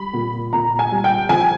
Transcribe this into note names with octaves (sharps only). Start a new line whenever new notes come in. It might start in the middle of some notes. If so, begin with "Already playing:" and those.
Already playing: G3 B5
A#2
A#2 A#5
G#5
G3
G5
F3 G#5